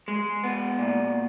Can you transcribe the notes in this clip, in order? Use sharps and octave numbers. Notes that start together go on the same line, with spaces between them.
G#3
B3
A#2